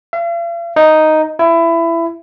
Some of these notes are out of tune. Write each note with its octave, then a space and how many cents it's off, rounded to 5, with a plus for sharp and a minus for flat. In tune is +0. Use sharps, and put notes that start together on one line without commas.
F5 -45
D#4 +0
E4 +20